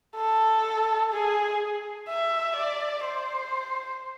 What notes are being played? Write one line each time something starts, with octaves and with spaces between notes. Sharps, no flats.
A4
G#4
E5
D5
C5